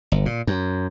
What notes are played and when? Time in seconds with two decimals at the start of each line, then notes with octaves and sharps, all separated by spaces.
0.12 G1
0.26 A#2
0.47 F#2